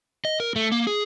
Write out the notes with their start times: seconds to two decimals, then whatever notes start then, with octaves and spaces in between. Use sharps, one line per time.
0.25 D#5
0.40 A#4
0.56 A3
0.72 A#3
0.87 G#4